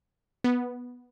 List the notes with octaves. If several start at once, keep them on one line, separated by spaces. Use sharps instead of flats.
B3